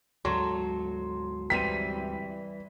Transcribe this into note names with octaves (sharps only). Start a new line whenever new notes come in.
D2 G#2 F#3 A4 C6
E3 G3 C4 B6 D#7